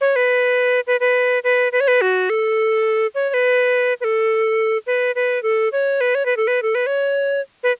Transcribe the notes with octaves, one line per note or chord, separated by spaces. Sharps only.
C#5
B4
B4
B4
B4
B4
C#5
B4
F#4
A4
C#5
C#5
B4
B4
A4
B4
B4
A4
C#5
B4
C#5
B4
A4
B4
A4
B4
C#5
B4